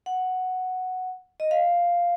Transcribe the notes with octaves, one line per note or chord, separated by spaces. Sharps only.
F#5
D#5
F5